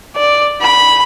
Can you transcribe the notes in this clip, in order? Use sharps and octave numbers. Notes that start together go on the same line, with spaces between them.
D5
B5